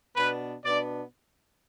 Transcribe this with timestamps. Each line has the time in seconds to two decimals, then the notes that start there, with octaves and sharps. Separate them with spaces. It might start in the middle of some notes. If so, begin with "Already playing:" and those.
0.16 B2 B3 D4 B4
0.64 B2 B3 D4 D5